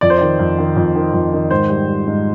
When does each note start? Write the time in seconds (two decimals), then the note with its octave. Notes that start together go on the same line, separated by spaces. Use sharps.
0.01 F2 D5
0.10 C5
0.17 D#3 D5
0.39 F2
0.58 D#3
0.76 F2
0.95 D#3
1.13 F2
1.33 D#3
1.51 G#2 C5
1.70 G3
1.89 G3
2.07 G#2